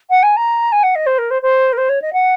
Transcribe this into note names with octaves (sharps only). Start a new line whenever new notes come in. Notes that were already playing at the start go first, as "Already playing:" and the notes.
F#5
G#5
A#5
G#5
F#5
D#5
C5
A#4
C5
C5
A#4
C5
C#5
D#5
F#5